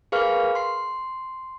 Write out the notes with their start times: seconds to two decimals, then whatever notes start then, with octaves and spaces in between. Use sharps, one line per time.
0.12 G#4 A#4 B4 F5 C#6 F6
0.55 C6 C7